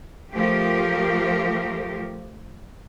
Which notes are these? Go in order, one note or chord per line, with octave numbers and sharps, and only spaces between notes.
F3 A3 G4 A#4